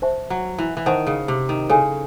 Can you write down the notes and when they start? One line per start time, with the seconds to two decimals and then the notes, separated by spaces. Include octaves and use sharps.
0.02 C5 E5 A5 C#6
0.30 F#3
0.58 E3
0.77 E3
0.86 D#3 C5 F#5 A5 C#6
1.07 C#3
1.28 C3
1.49 D#3
1.70 C#3 E4 A4 C#5 G#5